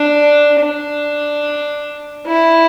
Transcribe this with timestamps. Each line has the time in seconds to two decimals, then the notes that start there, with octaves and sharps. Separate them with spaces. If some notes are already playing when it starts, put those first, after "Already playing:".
Already playing: D4
0.59 D4
2.26 E4